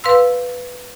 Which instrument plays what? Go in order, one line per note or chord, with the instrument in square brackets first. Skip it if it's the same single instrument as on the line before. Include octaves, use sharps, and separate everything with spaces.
[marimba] B4 F5 C6 E6